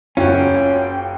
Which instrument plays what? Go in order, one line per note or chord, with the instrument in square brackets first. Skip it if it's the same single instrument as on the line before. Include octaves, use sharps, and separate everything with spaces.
[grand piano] F#1 F#4 [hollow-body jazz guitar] C#4 [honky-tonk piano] F4 [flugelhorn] G5